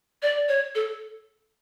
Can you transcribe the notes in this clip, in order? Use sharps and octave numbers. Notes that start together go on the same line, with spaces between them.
D5
C#5
A4